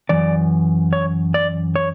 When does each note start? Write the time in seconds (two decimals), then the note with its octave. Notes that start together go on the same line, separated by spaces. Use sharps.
0.09 F#2 E3 D5
0.93 C#5
1.34 D5
1.76 C#5